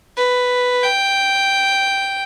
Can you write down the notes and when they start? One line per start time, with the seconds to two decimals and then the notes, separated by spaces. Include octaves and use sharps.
0.17 B4
0.83 G5